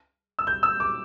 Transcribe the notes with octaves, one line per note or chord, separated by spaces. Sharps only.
E6
G6
E6
D6